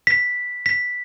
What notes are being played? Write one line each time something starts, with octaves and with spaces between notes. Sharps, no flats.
B6
B6